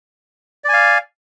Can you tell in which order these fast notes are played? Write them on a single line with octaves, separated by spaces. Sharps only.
D5 G#5 F5